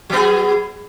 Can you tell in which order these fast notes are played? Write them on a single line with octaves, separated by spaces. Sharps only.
F#3 B3 G#4